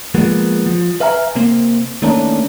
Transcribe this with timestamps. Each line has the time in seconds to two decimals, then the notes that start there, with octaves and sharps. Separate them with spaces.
0.15 F3 G#3 A#3 B3
0.66 F3
1.00 B4 E5 F5 G#5 A#5
1.36 C3 A#3 C4
2.02 D#3 A3 A#3 C#4 D4 A#4